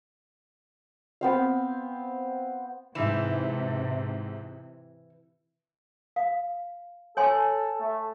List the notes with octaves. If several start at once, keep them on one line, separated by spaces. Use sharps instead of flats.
B3 C4 F5
G#2 C3 E3 E5 E7
F5
A4 C#5 G#5 C6
A3